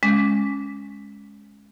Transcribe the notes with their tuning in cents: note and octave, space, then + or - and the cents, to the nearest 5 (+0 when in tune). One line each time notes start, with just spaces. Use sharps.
G#3 +0 C#4 +0 D6 -15